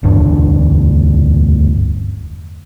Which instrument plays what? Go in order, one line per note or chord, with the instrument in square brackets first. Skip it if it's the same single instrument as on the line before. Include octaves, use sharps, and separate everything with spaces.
[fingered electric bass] E1 D2 G2 D4